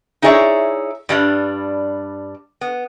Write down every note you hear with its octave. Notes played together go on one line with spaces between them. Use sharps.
D#4 E4 G#4 C#5 D5 E5
G2 G3 D4
B3